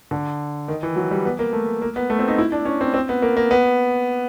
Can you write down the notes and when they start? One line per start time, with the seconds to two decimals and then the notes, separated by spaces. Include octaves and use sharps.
0.11 D3
0.68 D#3
0.83 E3
0.96 F#3
1.11 G3
1.25 B3
1.39 A#3
1.53 A3
1.82 A#3
1.96 B3
2.10 A3
2.19 C4
2.28 D#4
2.38 E4
2.52 D4
2.65 C#4
2.81 C4
2.94 C4
3.09 B3
3.22 A#3
3.37 A#3
3.51 B3